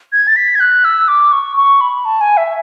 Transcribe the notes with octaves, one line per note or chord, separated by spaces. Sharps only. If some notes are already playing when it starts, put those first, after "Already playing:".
G#6
A6
B6
G#6
F#6
E6
D6
C#6
C#6
B5
A5
G#5
E5